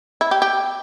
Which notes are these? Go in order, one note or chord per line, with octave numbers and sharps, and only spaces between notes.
E4
G4
G4